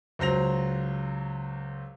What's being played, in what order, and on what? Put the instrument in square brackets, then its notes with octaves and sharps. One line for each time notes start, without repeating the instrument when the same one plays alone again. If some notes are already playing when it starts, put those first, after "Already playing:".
[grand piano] C#2 F#3 C5 A#6 F7